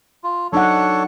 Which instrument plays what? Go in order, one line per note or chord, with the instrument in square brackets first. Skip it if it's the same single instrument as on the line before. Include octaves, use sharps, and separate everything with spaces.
[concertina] F4
[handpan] F#3 D#4 F#5 [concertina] D4 A4 C#5